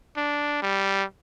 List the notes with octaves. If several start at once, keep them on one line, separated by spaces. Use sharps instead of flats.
D4
G3